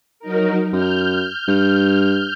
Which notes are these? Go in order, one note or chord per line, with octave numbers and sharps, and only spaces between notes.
F#3 D#4 A#4
F#2 F6 G6
G2